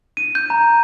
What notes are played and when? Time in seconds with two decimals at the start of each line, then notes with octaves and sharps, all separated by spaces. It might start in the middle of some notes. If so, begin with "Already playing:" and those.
0.17 D#7
0.35 G6
0.50 A#5